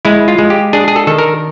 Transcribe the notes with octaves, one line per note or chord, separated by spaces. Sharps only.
G#3 E4
F4
G#3
G4
D4 G#4
G#4
A4
D#3 A4
A#4